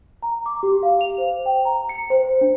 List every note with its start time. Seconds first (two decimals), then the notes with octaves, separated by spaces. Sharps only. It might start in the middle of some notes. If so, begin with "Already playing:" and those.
0.23 A#5
0.46 D6
0.63 G4
0.83 F5
1.01 F7
1.18 C5
1.46 G5
1.65 A#5
1.89 C#7
2.10 C5
2.41 D4